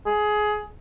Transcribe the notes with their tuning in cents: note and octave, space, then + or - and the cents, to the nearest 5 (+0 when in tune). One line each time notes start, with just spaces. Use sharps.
G#4 +20